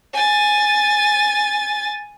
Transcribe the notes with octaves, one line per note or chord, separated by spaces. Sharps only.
G#5 A6